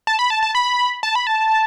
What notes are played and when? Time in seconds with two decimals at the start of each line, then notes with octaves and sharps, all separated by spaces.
0.07 A5
0.19 B5
0.30 A5
0.43 A5
0.55 B5
1.03 A5
1.15 B5
1.27 A5